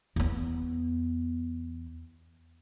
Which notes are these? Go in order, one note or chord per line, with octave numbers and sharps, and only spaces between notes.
E2 B3